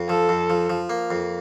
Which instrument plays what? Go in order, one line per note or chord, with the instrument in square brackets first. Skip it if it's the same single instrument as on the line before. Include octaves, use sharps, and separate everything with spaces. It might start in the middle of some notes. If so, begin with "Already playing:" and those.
Already playing: [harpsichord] F2
[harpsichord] F3 [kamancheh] A4
[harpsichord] F2
F3
F3
A#3
F2